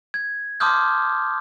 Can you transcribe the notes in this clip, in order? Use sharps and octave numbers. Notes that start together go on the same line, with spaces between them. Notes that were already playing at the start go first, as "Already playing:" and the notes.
G#6
A5 C6 D6 D#6 F6 G6